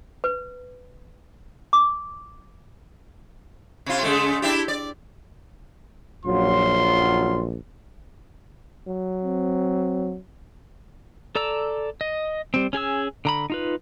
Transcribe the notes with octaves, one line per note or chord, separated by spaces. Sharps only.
B4
D6
C3 F4
C#3 G#3 A3
D4 E4 G4
D5
A#1 F#2 F#3 F4 C6
F#3
C4
A4 D5 A#5 E6
D#5
G3 C4
C#4 G#4 G#5 E6
D3 A#5 B5
D#4 F4 B4